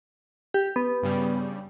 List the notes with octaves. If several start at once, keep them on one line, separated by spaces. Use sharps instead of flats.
G4
B3
G2 C#3 G3